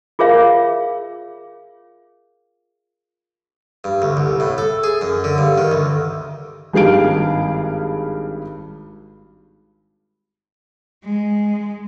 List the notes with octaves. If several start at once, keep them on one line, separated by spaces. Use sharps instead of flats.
F4 G#4 A#4 C#5 E5 F5
G2
D2
C2
A2
A4
G#4
F#2
D3
G2
D#3
D2
G#1 G2 G#4 F5 D7
G#3